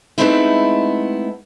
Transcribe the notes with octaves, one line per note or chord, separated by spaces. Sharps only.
G#3 A3 B3 C4 D#4 E4